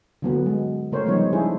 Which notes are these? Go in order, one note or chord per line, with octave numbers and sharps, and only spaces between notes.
D3 F#3 B3
G#3
C#3 A3 A#4 C5 C#5
F3 G3 G#3 B3 D#4 C#5
D4 E4 G#4 C5